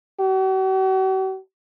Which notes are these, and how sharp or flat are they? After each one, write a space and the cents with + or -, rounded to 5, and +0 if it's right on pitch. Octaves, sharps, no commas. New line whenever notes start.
F#4 +45